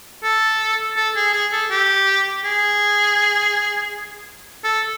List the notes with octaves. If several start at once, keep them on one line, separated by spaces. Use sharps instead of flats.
A4
A4
G#4
G#4
A4
G4
G#4
A4